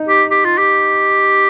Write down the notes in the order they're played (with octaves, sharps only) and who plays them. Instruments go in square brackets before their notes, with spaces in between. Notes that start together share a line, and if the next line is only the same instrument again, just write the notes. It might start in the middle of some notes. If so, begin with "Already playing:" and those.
Already playing: [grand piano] D#4
[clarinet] G4
G4
F4
G4